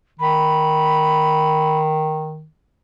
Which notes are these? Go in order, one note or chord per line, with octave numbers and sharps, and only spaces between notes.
D#3 B5